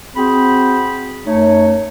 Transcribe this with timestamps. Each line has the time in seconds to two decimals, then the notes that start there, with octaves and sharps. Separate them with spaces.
0.16 C4 F#4 G#4 G5 B5
1.25 F#2 A3 D#4 C#5